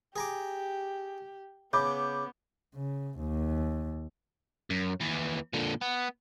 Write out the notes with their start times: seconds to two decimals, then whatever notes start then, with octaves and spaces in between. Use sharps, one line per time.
0.16 G4 G#4 A#5 D6
1.73 C#3 B3 B5 D6 G6
2.75 C#3
3.19 D#2
4.70 F#2
5.01 D#2 E3
5.53 A#2 D3
5.81 B3